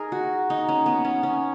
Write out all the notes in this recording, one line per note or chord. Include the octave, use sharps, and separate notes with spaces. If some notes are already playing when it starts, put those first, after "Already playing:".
Already playing: D#4 G#4 A#4
F#4
D#4
C#4
B3
C#4
C#4